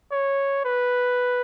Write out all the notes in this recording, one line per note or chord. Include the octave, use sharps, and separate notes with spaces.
C#5
B4